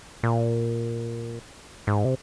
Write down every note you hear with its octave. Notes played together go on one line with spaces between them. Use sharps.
A#2
G#2
C3